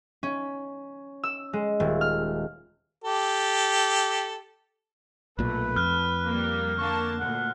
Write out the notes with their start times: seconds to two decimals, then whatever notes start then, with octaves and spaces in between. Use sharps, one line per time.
0.23 C#4
1.24 E6
1.53 G#3
1.80 D#1
2.01 F6
3.04 G4 A4
5.39 B1 A#2 A3 B4
5.76 F2 F6 F#6
6.26 G3 A#3
6.79 D3 A#3 A5 C#6
7.19 D2 A#2 F#5